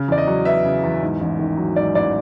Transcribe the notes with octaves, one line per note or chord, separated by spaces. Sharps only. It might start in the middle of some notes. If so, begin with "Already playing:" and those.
Already playing: C#3
E2 D5
D#5
F#3
B3 E5
C#3
E2
G#2
A1
D#3
F#3
G#2 D5
A1 D5